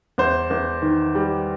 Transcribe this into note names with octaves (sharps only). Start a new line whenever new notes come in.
E2 C5
E2
D#3
G3